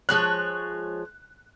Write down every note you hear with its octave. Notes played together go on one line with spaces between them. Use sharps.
F3 G#3 C#5 F#6